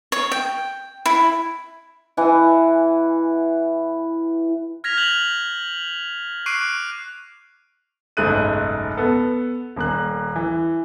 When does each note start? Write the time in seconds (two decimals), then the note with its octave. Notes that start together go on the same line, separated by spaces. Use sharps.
0.12 C#5
0.32 G5
1.06 E4
2.17 E3 F#5 G#5
4.84 F6 G#6 A#6 B6 F7
4.97 G6 F7 F#7
6.46 C#6 D6 F#6 C7 D7 D#7
8.17 F#1 B1 G#2 A3 F#6 D#7
8.97 B3 A4
9.76 D#1 A#3 F#6
10.36 E3